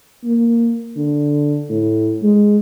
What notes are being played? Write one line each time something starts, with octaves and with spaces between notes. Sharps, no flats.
A#3
D3
A2
G#3